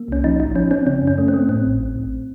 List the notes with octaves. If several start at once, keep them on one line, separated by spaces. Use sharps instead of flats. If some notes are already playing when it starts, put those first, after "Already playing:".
Already playing: A#3
C2 C#4
F3 D#4
A1 D#4
F3 C#4
C4 C#4
C#3 C#4
F#2
C#4
A3
C4
A3
A2 C4
A1
A1
A1